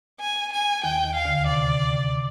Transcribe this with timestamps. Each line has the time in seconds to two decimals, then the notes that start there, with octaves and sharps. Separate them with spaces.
0.20 G#5
0.52 G#5
0.84 D#2 D#3 G5
1.04 D#2 D#3
1.15 F5
1.25 D2 D3
1.46 C3 D5